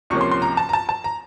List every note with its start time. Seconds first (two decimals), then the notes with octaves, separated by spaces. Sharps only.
0.10 C#2 C3 F3 A#3 C#4 C#6
0.21 C6
0.31 C6
0.42 A#5
0.57 A5
0.69 A#5
0.73 A5
0.89 A5
1.04 A#5